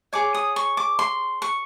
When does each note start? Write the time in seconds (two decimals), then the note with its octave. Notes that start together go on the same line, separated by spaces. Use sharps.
0.13 G#4 C#5 D6
0.34 D#6
0.56 C#6
0.77 D6
0.99 C6
1.42 C#6